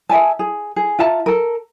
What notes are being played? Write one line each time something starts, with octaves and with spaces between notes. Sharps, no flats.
G#4 E5 G#5 A5
G#4
G#4
F4 E5 A5 A#5
A4 A#4